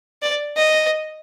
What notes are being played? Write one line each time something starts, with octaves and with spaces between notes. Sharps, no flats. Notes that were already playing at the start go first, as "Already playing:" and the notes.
D5
D#5